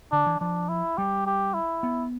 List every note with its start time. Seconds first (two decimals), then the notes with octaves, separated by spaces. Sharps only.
0.12 D3 D4
0.26 E3
0.40 F3 D4
0.69 E4
0.98 G3 G4
1.26 G4
1.54 E4
1.83 B3